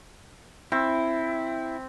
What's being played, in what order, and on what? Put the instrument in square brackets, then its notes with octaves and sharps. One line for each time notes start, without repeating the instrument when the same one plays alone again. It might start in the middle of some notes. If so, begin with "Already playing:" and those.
[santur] C4 [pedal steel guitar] E4